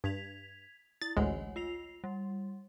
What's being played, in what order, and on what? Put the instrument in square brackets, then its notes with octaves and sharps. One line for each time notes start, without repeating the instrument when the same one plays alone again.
[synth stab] G2 [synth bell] G#6 B6 F7
[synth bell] E4 [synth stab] A6
[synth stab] A1 D2 G#3 [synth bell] C#5 F#5 G#5
[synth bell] F4 C7 F7
G3